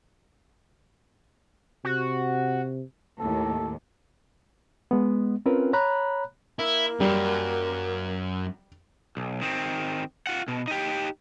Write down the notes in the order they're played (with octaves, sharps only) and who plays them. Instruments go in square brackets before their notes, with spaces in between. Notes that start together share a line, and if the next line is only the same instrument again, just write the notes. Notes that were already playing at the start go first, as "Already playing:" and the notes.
[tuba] C3 [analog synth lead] F#4
[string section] D#2 A2 [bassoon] A4
[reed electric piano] G#3 B3
C4 C#4 F4 A#4 B4
C#5 A#5 B5 F#6
[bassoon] A#3 [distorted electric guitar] E4
[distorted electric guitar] F#2 [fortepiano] G3
[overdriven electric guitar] B1
D#3 C4
F4 F#5
B2
D#4 G4